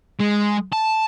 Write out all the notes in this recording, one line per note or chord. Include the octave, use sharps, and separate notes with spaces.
G#3
A5